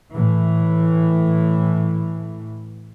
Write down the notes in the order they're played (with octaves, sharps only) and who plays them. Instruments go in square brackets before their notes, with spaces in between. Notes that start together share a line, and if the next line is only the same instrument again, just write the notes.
[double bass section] A2 E3